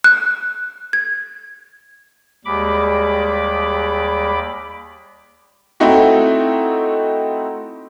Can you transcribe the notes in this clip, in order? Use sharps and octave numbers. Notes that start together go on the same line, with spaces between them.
F#6
G#6
D#2 G3 G#3 B5 D6
A3 C4 D#4 E4 F#4